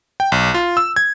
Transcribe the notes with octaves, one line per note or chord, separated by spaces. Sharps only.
G5
B1
F4
E6
G#6